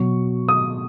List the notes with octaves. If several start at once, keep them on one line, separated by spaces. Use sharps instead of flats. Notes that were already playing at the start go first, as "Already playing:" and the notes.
Already playing: B2 F#3 C#6
D#6